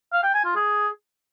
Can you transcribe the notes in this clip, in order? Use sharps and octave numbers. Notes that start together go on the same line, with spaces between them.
F5
G5
G#5
F4
G#4